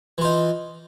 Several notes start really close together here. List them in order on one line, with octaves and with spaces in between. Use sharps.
E3 F4 D#4